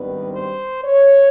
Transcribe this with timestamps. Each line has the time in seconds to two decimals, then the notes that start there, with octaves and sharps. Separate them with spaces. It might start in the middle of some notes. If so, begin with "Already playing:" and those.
Already playing: G#1 G2 D#3 G3 B3 B4
0.33 C5
0.85 C#5